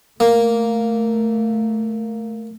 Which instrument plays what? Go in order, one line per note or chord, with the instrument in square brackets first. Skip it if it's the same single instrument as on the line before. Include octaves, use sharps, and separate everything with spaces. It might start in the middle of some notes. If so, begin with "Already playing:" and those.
[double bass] A3 [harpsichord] A#3